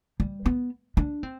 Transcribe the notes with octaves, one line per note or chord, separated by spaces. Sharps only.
G3
B3
D4
C4